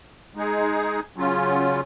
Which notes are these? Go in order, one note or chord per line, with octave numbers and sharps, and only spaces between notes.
G#3 D#4 G#4
C#3 F#3 C#4 F4